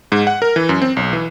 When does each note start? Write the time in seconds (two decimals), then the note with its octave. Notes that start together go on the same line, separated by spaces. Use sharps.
0.12 G#2
0.27 F#5
0.42 A#4
0.56 E3
0.69 F#2
0.82 C4
0.97 B1
1.13 E3